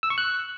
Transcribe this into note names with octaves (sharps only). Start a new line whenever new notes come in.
E6
C#6
F#6